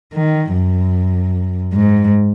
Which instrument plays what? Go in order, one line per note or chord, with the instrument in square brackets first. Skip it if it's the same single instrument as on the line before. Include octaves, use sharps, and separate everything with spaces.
[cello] D#3
F#2
G#2